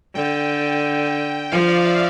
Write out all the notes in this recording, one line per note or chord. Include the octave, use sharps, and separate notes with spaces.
D3 G5
F3 F5
D5
E5